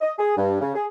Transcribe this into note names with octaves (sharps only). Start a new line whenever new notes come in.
D#5
G#4
G2
C#3
G#4